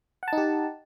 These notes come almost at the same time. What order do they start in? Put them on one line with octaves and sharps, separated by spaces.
F#5 A5 D#4 G4